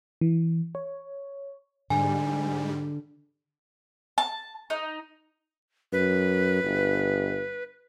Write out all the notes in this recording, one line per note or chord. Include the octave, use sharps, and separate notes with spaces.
E3
C#5
G#2 D3 G3 G#5
A5
D#4
F#2 B4
G1